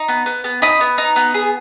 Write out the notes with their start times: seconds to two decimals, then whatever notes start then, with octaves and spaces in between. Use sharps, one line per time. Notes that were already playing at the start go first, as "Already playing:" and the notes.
Already playing: D#4
0.08 B3
0.26 B3
0.44 B3
0.62 D#4 B5 D#6
0.81 B3
0.98 D#4
1.16 B3
1.34 G#4